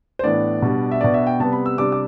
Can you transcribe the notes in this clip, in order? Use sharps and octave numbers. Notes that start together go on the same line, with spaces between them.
C5
A2 E3 B3 D4 D5
B2 G3 D4
E5
B2 B3 D4 D5
E5
G5
C3 G3 B3 A5
B5
E6
C3 G3 D4 D6
D6